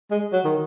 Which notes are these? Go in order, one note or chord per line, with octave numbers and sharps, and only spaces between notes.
G#3
F#3
D#3